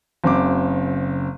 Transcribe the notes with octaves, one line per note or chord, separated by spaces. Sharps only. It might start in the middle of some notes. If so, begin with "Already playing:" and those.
F#1 C#3 C4 D6